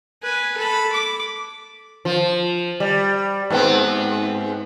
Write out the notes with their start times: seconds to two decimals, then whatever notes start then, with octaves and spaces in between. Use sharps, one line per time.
0.23 B4 G#5
0.58 A4 B5
0.93 D6
2.05 F3
2.80 G3
3.50 G#2 B3 C4